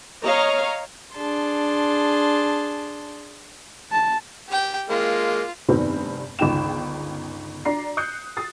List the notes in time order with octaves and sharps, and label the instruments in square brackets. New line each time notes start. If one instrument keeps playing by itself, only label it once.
[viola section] C#5 D#5 F5 A#5
[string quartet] D4 G#4 A5 C6
[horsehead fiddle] A5
[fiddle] G4 G5
[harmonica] G#3 A#3 [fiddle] F4
[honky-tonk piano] F1 G2 D#3 B3 C4
G1 C#2 D#3 G#4 G5 E7
D4 D5 A#5 C7
D#6 F#6 G6 C7 C#7
D#6 A6 C7